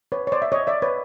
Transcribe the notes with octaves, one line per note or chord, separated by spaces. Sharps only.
B4 C#5
C#5
C5 D5
E5
C#5 D#5
D5 E5
B4 C#5